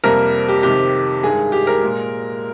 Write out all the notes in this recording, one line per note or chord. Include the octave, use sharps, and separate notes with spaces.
F2 C3 G3 A#3 A#4
G4
F2 C3 D#3 G4
G2 D#3 G#3 G#4
G4
A#4
A#2 G#3